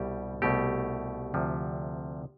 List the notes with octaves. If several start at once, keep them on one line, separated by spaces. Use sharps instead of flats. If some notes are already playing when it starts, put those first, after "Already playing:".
Already playing: C2 B2 G3 G4
C2 B2 A3 G4
D2 C3 F3